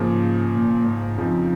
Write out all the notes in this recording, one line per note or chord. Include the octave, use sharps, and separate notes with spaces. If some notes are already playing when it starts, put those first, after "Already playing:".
Already playing: G#2 C#3 F3 A#3
A#2
G#2
F2 C#3 F3 C4 D#4